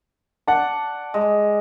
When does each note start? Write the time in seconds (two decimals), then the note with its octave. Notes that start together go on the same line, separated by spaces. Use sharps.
0.47 D5 F#5 A5
1.14 G#3